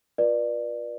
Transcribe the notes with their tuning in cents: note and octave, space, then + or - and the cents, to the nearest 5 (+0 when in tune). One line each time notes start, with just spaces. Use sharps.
F4 +10 B4 -40 D5 +25